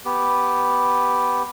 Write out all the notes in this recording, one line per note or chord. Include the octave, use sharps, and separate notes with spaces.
B3 G4